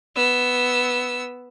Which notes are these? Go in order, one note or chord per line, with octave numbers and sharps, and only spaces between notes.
B3 E6